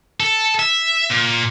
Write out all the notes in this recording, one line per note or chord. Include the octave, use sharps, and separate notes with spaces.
A4
E5
A#2